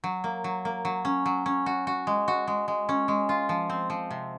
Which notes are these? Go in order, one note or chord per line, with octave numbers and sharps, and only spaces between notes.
F#3
A#3
F#3
A#3
F#3
C#4
F#3
C#4
F#4
F#4
G#3
F#4
G#3
G#3
C#4
G#3
F4
F3
C4
F3
C3